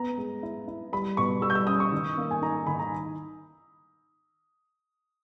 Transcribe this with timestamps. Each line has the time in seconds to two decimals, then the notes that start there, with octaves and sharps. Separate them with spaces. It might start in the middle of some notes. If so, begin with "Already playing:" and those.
Already playing: B3 A#5
0.18 G#3
0.43 E4
0.68 E4
0.92 G3 B5
1.17 B2 C#6
1.42 G3 E6
1.50 G6
1.55 E6
1.67 C#4 D#6
1.80 C#6
1.92 D#3
2.17 A#3
2.31 G#5
2.42 D#4 A#5
2.67 D#3 B5
2.79 A#5